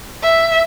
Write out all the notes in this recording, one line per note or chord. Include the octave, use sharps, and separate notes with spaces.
E5